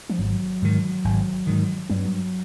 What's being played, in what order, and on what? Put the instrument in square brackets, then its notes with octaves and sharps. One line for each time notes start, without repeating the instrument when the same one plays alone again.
[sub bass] F3
[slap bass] G#1 [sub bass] F#3
[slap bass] G#2 D#3
G#1
G#2 D#3
[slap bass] G2 [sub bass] F#3